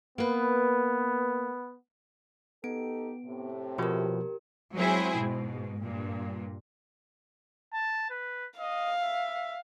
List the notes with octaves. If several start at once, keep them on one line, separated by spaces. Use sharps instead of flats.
A#3 B3 B4
B3 D#4 G4 A4 D7
A2 C3
B2 F3 B3 G4 A#4
F#3 G#3 C4 E4 G#4 C5
G#2 B2
G2 A#2
A5
B4
D#5 F5
E5